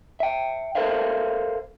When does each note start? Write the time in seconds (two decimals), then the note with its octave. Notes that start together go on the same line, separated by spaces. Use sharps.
0.20 E5 G5
0.75 A4 A#4 C5 E5 F5